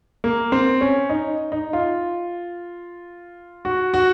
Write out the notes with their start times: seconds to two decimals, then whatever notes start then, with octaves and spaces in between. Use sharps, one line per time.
0.24 A#3
0.52 C4
0.81 C#4
1.09 D#4
1.52 D#4
1.73 F4
3.65 F#4
3.94 F#4